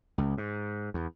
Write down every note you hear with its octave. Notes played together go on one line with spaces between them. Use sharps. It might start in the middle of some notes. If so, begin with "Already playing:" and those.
C#2
G#2
E2